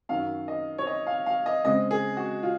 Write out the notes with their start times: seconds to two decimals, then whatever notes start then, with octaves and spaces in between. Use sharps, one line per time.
0.09 F#2 D#3 F#3 F5
0.48 D#5
0.78 C#5
0.87 D#5
1.07 F5
1.26 F5
1.46 D#5
1.65 C#3 G#3 C4 D#5
1.91 G#4
2.17 F#4
2.43 F4